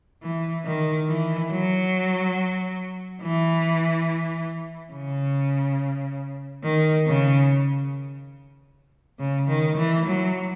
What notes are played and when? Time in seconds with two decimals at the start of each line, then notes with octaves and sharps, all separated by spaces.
0.22 E3
0.65 D#3
1.08 E3
1.51 F#3
3.22 E3
4.93 C#3
6.63 D#3
7.07 C#3
9.19 C#3
9.48 D#3
9.77 E3
10.05 F#3